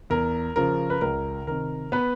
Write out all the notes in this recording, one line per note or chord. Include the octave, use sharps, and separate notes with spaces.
E2 A#4
C#3 F3 A#4
B4
C#2 A#4
C3 D#3 A#4
B3 B4